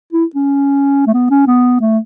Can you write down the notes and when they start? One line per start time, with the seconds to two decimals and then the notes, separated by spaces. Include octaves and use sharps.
0.13 E4
0.36 C#4
1.07 A3
1.14 B3
1.30 C#4
1.47 B3
1.81 A3